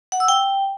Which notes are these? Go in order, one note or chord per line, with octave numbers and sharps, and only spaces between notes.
F#5
E6
G5